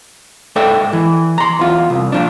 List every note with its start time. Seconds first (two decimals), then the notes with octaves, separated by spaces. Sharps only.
0.56 G#2 A4 D5 E5 G5
0.93 E3
1.38 A#5 C6
1.59 E2 F4
1.90 C2
2.12 A#2 F3 D4